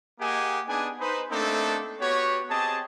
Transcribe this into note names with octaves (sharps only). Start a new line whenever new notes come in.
A#3 G4 G#4 D#5 F#5 G#5
B3 D4 D#4 G#4 G#5
D#4 B4 C5
A3 A#3 C4 D4 D#4 A4
B3 F#4 G4 C#5
C4 G4 G#4 D#5 A5